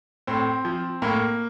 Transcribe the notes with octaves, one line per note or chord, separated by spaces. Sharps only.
A2 C4
F3
A2 A#3